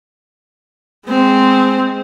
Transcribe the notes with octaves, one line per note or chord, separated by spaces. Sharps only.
G#3 C4